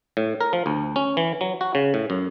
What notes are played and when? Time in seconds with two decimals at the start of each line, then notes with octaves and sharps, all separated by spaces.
0.17 A2
0.41 A#4
0.53 F3
0.66 D2
0.96 C#4
1.17 E3
1.41 F#3
1.61 F#4
1.75 C#3
1.94 A2
2.10 F#2